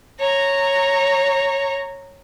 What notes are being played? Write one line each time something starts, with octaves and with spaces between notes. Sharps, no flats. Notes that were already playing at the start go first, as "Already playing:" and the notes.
C#5 A#5